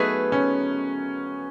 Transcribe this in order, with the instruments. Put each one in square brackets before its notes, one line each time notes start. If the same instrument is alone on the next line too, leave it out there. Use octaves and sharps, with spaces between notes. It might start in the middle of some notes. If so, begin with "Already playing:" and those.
Already playing: [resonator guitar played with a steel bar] F#3 A3 D#4 G#4 B4 [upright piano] B3
[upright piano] C#4